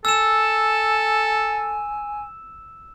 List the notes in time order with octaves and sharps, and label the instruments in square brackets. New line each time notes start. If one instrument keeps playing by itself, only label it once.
[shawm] A4 [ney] G#5 [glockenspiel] E6 E7